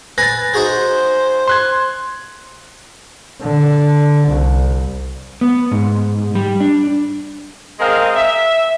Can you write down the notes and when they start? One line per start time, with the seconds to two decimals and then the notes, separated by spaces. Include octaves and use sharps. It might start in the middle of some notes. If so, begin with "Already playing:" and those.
0.18 B4 G#5 B5 A6 A#6
0.54 D#4 F#4 G#4 C5
1.48 C6 F#6 G#6
3.42 D3
4.29 C2
5.41 B3
5.72 G#2
6.35 G3
6.60 D4
7.79 G#3 C4 G#4 A#4 D#5 F5
8.15 E5